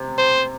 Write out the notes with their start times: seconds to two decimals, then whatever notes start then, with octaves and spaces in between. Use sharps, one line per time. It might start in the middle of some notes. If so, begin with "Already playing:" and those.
Already playing: C3
0.18 C5